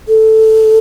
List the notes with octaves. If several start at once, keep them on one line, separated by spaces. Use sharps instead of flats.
A4